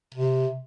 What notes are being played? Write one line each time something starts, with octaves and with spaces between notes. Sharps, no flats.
C3